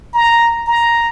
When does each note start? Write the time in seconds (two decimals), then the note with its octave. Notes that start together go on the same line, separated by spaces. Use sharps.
0.14 A#5
0.67 A#5